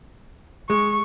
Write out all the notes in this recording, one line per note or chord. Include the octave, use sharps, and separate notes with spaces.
G#3 C#6